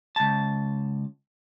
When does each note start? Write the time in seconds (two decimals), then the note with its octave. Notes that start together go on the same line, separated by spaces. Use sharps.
0.16 C#2 A5